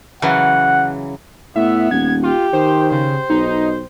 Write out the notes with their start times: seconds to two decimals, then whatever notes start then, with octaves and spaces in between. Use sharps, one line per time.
0.22 C#3 E3 F#3 F#5
1.56 A2 B3 E5
1.91 D#1 G#6
2.23 F4 G4
2.53 D#3 C5
2.92 C#3 C5
3.30 B1 D#4